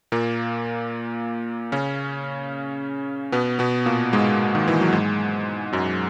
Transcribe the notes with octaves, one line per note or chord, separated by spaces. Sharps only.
A#2 A#3
C#3 C#4
B2 B3
B2 B3
A#2 A#3
G#2 G#3
D#3
E3
F#3
G#2 G#3
F#2 F#3